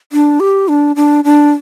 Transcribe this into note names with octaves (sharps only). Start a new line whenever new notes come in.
D4
G4
D4
D4
D4